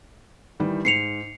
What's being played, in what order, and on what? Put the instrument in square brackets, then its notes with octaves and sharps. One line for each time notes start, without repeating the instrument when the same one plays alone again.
[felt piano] D#3 E3 G3
[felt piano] G#2 [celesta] C7 C#7 F7